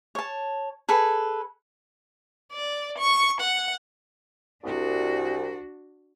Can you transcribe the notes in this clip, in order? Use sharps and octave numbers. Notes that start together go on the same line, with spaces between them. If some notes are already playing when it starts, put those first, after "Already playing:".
C#5 A5
G#4 A4 B4 B5
D5
C#6
F#5
C2 D4 F#4